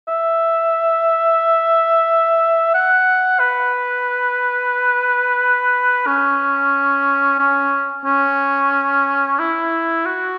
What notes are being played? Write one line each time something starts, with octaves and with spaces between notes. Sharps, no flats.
E5
F#5
B4
C#4
C#4
C#4
E4
F#4